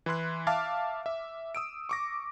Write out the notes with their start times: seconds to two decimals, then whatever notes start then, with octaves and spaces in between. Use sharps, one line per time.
0.06 E3 E4 C6 F#6
0.47 E5 F5 A5 D6 F6
1.06 E5
1.55 D#6 E6 D7
1.89 C#6 D6 A#6